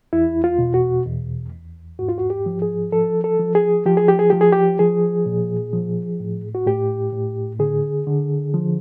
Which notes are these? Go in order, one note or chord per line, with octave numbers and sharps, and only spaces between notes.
E2 E4
F4
B2
F#4
E2
E2
G#2 F#4
F4
F#4
G4
F3
G#4
F3 A4
A4
F3
G#4
F3 G4
G#4
G4
G#4
F3 G4
G#4
G4
F3 G#4
A#2
F3
A2
F#4
A2 G4
A2
D3 G#4
D3
F3